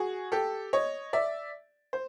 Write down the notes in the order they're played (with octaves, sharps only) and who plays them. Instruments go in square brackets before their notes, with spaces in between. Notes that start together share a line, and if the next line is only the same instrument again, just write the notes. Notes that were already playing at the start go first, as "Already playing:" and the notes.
Already playing: [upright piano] F#4 G#4
G4 A4
C#5 D#5
D5 E5
C5